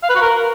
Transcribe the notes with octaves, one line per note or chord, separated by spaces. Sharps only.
F5
B4
F#4
A#4